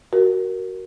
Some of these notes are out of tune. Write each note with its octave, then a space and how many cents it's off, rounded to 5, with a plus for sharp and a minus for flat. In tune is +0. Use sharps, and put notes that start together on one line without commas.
F#4 +15 A#4 +0